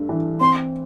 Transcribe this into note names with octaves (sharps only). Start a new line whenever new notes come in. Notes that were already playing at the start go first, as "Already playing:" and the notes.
Already playing: G2 A3
E3
C4 C6